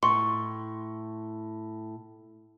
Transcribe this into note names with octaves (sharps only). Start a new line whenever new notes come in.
A2 C6 C#6